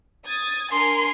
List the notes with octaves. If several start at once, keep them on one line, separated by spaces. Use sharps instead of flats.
D#6 G#6 A6
D4 A#4 G#5 C6